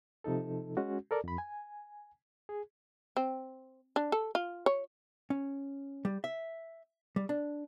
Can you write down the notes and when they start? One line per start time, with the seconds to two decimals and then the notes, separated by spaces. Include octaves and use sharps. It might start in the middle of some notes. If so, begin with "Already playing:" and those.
0.24 C3 F3 D#4 A4
0.77 G#3 C#4 F#4
1.11 A4 A#4 D5
1.24 F2 B5
1.38 G#5
2.49 G#4
3.17 C4
3.96 D4
4.12 A4
4.35 F4
4.66 C#5
5.30 C#4
6.05 G3
6.24 E5
7.16 G3
7.29 D4